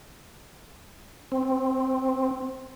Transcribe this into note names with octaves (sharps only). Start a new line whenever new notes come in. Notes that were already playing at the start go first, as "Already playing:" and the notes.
C4